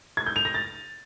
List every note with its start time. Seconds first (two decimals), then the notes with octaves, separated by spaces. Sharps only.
0.17 G#6
0.26 G6
0.36 F7
0.45 A#6
0.54 A6